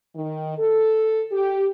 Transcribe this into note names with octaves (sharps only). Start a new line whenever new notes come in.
D#3
A4
G4